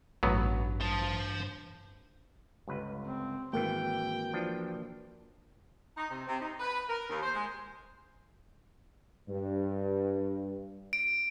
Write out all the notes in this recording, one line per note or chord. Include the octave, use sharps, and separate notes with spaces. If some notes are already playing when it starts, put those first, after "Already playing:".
A1 G2 F#3 B3
C5 A5
G1 C#2 B4
C4
G#1 E3 A#3 F#4 A#4 G5
E3 F3 D4
D#4
C3
C3
D#4
B4
A#4
D#2
C5
G#3
G2
D7